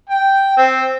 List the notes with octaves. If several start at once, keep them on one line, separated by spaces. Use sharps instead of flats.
G5
C4